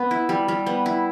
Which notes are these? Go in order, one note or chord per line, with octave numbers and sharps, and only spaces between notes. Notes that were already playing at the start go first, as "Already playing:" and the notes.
Already playing: B3
E4
G3
G3
B3
E4